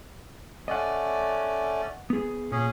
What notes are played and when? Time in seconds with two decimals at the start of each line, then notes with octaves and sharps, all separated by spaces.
0.68 A3 C#4 D5 D#5 F#5
2.10 B3 G#4
2.52 A#2 C#4 G#4